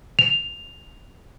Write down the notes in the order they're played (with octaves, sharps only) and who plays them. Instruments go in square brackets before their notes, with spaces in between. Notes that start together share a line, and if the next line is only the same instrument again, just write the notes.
[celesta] F7